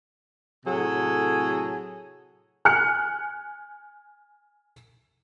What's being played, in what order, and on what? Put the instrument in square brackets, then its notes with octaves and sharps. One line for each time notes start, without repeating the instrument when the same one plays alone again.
[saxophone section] A2 C3 F#3 G#4 A4
[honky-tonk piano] G#5 F6 F#6 C#7